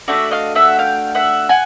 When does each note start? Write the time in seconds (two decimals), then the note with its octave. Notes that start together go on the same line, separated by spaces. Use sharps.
0.08 A3 D4 F#4 D5 E5
0.31 D#5 F5
0.55 E5 F#5
0.79 F5 G5
1.15 E5 F#5
1.49 F#5 G#5